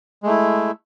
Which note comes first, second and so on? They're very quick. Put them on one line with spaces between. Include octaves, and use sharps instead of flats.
G#3 A3 E4